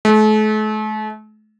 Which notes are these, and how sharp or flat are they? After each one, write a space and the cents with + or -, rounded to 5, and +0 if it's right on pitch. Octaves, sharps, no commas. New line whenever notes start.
A3 -40